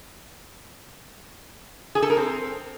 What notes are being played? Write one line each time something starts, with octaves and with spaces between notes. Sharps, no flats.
G#4
A4
A#4
C4